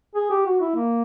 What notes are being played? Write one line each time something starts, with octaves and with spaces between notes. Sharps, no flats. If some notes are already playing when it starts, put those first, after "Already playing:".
G#4
G4
F#4
E4
A#3